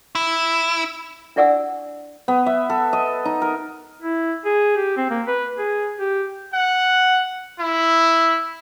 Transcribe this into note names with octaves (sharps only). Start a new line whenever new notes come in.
E4
D4 E4 D5 F#5 G#5 E6
B3
E5
A4
D#5
D#4
A#4
E4
G#4
G4
C4
A#3
B4
G#4
G4
F#5
E4